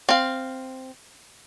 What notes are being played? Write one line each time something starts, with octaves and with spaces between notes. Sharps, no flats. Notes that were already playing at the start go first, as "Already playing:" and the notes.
C4 F5